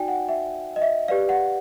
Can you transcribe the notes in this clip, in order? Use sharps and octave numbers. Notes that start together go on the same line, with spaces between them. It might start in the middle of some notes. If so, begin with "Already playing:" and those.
Already playing: D#4 F#4 D5 G5 G#5
F#5
E5
D#5
E5
G4 B4 D5 F5
F#5